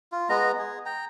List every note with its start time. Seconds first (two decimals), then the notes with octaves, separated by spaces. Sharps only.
0.12 F4
0.29 G#3 B3 D#5 A#5
0.59 G#4
0.86 G5 A#5